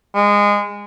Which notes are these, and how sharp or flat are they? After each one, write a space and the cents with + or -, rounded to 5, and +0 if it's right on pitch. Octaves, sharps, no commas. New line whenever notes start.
G#3 -20